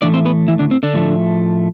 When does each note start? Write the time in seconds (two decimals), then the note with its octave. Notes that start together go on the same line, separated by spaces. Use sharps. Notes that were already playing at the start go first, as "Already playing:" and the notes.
0.02 A2 E3 A3 D4 D5
0.13 C4 C5
0.25 B3 B4
0.48 E3 E4
0.59 D3 D4
0.71 C4
0.83 D3 D4
0.94 A2 F3 A3